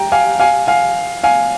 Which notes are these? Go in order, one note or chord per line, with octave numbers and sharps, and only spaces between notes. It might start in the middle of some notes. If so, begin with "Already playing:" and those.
Already playing: G5 A#5
F5 G#5
F5 G#5
F5 G#5
F5 G#5